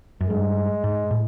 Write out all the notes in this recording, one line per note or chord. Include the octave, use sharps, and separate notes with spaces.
F#2
G2 G#3
G#2
A2